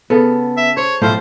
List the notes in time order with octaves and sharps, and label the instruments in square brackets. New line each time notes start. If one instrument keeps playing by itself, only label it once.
[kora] C#3 A4 [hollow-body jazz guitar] B3
[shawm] E5
[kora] C5 [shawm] C#5
[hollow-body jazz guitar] B1 A2 A3 [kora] F3 F4 [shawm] C5